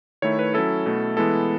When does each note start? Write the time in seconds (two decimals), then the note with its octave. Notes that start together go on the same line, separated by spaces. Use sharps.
0.22 D#3 A3 E4 C#5
0.39 B4
0.54 F#3 C#4 E4 A4
0.86 B2 A3 E4
1.17 E3 G#3 B3 E4 A4